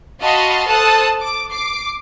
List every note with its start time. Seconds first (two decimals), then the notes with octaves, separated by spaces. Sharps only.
0.21 F#4 D#5 F5 A5 B5 C6
0.68 A4 C5 A5 D#6 F#6
1.21 D6
1.51 D6 C7